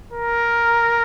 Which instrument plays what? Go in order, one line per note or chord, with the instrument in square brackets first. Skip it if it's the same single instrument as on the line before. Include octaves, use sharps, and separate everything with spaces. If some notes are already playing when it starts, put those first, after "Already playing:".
[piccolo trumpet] A#4